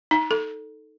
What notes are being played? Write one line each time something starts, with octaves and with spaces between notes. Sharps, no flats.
D#4
A4